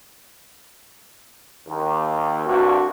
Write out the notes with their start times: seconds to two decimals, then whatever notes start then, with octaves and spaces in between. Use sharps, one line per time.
1.68 D#2
2.47 C2 G2 F#4